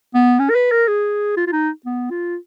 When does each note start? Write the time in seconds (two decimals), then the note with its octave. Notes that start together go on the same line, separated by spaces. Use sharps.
0.14 B3
0.39 C#4
0.50 A#4
0.55 B4
0.71 A#4
0.88 G#4
1.37 F4
1.47 F4
1.52 D#4
1.86 B3
2.10 F4